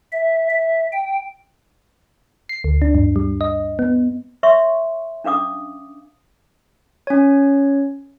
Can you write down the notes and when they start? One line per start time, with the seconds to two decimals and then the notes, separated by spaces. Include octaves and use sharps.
0.13 E5
0.50 E5
0.93 G5
2.49 C7
2.64 D2
2.82 D4
2.95 G2
3.16 G3
3.41 D#5
3.79 B3
4.43 C#5 E5 C6 C#6
5.24 C#4 D4 F5 D6 D#6
7.07 C#4 C#5